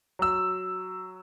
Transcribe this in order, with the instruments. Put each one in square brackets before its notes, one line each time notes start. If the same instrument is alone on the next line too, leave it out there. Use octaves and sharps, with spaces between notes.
[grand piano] F#3 E6